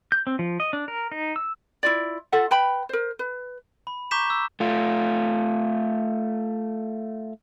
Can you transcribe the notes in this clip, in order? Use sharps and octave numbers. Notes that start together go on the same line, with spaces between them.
G6
C4
F3
D#5
D4
A#4
D#4
E6
E4 F4 D5
F4 A4 E5 F#5
B4 G5 B5
A#4 C5
B4
B5
A#5 C#6 D6 G6 B6 E7
E6
A3 F4